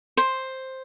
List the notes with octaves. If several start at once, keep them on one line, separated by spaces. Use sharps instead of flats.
C5